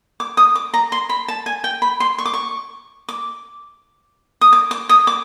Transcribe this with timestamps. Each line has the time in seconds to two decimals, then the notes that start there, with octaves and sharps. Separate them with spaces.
0.20 D6
0.37 D#6
0.55 D6
0.74 A#5
0.92 C6
1.09 B5
1.28 A5
1.46 G#5
1.64 G5
1.82 B5
2.00 C6
2.18 C#6
2.26 D6
2.34 C#6
3.09 D6
4.41 D#6
4.53 D6
4.71 D6
4.89 D#6
5.07 D6